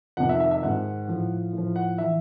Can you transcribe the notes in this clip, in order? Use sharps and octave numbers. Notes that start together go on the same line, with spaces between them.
F2 C3 D#3 F#5
E5
E5
E5
G#2 D#3 F#5
A2 F3
A2 F3
F#5
E3 E5